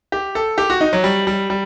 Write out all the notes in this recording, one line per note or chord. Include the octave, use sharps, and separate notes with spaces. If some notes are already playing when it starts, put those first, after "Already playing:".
G4
A4
G4
F#4
D#4
F#3
G3
G3
G3